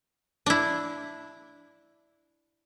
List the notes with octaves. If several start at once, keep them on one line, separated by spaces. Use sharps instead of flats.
D4 E4